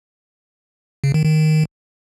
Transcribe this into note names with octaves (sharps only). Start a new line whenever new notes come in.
C#3
D#3
D#3